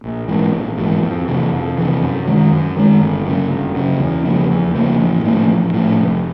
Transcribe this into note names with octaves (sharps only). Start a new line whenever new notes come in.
A#1
G#2 E3
A#1
G#2 E3
F2
C3 E3
F2
C3 E3
F#2
D#3 G#3
F#2
D#3 G#3
G1
F#2 C#3
G1
F#2 C#3
E2
C#3 F3 A#3
E2
C#3 F3 A#3
A1
A2 F3 A3
A1
A2 F3 A3
F1